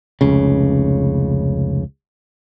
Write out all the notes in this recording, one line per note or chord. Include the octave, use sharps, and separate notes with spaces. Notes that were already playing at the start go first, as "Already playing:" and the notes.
F1 C#2 C#3